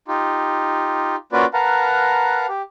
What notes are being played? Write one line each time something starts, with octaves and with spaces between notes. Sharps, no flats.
D#4 F4 G4
A#3 C#4 F4 F#4 B4 D5
A#4 B4 F5 F#5 A5 A#5
G4